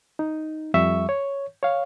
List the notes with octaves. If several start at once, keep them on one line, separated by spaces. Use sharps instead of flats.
D#4
F2 G3 E5 C#6
C#5
C#5 F5